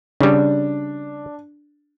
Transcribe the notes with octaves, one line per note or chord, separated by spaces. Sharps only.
C#3 G3 D4